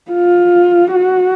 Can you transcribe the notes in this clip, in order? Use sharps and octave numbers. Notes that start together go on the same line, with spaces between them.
F4
F#4